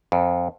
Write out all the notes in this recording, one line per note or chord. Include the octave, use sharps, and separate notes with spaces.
F2